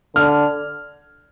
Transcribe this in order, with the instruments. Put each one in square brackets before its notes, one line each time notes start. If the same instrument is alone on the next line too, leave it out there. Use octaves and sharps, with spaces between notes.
[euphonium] D3 [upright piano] F6